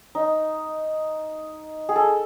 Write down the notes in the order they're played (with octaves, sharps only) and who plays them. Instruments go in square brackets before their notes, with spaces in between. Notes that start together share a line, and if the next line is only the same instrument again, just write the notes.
[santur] D#4
G#4
A4